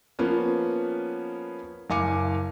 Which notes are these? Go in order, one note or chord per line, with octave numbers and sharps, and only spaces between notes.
F3 A#3 B3 C#4
F#1 F5 G#5 D6 C#7